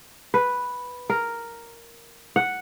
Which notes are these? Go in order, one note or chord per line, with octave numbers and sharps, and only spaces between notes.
B4
A#4
F#5